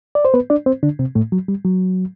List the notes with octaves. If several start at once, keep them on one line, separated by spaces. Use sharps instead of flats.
D5
C5
B3 B4
D4 D5
C4 C5
D3 D4
C3 C4
A2 A3
F#3
G3
F#3